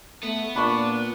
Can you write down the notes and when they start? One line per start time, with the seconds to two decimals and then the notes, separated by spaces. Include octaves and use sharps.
0.23 A3 B3
0.56 A#2 D4 B5 C#6